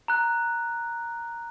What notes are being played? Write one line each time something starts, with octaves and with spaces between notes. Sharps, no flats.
A#5 F#6